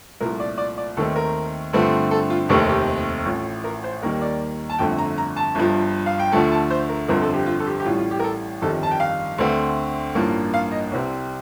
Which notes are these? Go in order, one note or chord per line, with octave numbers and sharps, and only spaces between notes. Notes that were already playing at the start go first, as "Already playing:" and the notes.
C2 A#2 F3 A3 A#4
D5
D5
D5
D#2 D#3 A3 C4 A4
A#4
G2 D3 F3 A3 C4
A4
F4
F1 D#2 D#3 A3 C4 G4
G4
A1 A2 F3 A3
A#4
C5
D#2 D#3 G3 A#3 A#4
D5
A5
G1 F2 D3 A3 G5
A#5
A#5
A5
G1 G2 F3
F5
G5
D2 D3 F3 A3 A5
A5
C5
A#4
G1 F2 D3 F3 C4 A#4
A4
G4
F4
A4
G4
G4
A1 A2 G3 F4
F4
G4
A#4
A4
G1 F2 D#3 G3 A4
A5
G5
F5
D2 D3 A3 C4
A1 G2 F3 A#3
F5
D#5
C2 C3 G3 C4